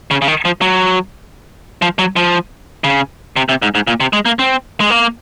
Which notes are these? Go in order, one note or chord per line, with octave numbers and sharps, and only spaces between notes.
C#3
C#3
D#3
F3
F#3
F3
F#3
F3
C#3
C3
C3
G#2
G#2
A#2
C3
G#3
A#3
C4
G#3
A#3